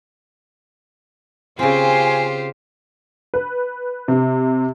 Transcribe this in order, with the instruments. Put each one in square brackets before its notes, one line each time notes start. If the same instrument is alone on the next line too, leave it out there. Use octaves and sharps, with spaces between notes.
[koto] C#3 C4 [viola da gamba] F4 G4 C5 [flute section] G#5
[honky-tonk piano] B4
C3